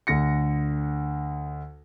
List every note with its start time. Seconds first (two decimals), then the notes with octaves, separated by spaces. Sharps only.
0.07 D2 D3 A#6 C#7